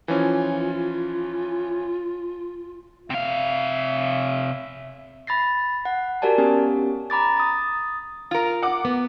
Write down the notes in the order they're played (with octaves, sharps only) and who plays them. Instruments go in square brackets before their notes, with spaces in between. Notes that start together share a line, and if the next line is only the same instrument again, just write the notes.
[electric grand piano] E3 F3 C#4 [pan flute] F4
[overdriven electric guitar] C3 F5 [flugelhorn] E5
[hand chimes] B5 A6 A#6 C7
F#5
F#4 G4 A#4 D5 G#5 A5
B3 C#4 G4 G#5
A#5 B5 D6 A6
D#6 A6
[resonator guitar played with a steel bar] F4 A#4
[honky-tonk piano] F#5 D6
[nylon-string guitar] B3